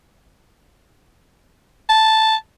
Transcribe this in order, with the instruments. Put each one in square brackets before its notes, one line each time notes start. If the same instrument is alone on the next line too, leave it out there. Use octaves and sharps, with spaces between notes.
[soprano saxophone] A5